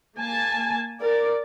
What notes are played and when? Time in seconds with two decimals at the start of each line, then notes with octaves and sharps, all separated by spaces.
0.16 A#3 G#5 A5
1.00 A#4 D5